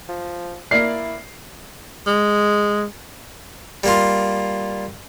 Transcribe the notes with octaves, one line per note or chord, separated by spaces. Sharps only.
F3
A#3 E4 D5 F6 C7
G#3
G3 A#3 F4